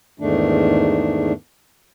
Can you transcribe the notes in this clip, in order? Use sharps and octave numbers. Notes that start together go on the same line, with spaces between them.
E2 G#2 D#3 A3 D4